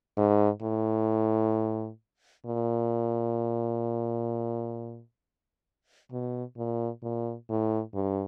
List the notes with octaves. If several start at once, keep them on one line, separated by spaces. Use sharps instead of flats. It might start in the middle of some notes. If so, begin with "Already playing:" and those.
G#2
A2
A#2
B2
A#2
A#2
A2
G2